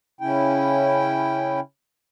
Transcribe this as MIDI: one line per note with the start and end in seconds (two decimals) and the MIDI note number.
0.21 1.60 49
0.21 1.60 61
0.21 1.60 64
0.21 1.60 79